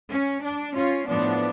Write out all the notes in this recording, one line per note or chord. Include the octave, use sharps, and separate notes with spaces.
C#4
D4
C#4 F4
A2 F3 B3 D4